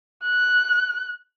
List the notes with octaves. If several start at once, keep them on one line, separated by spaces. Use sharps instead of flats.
F#6